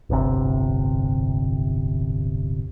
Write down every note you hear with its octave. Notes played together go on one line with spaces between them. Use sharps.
D1 G1 C3